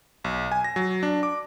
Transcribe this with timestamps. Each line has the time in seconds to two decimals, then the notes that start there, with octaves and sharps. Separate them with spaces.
0.24 B1
0.51 G#5
0.64 A#6
0.76 F#3
1.03 D4
1.23 D6